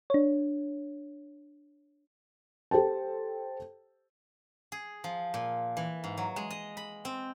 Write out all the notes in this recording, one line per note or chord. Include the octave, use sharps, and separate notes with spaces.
D4 C#5
G4 A4 C5 G5 A5
G#4
F3
A#2
E3
G#2
F#3
G#3
D#5
B5
C4